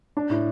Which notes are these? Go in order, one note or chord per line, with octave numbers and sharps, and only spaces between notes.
D4
A2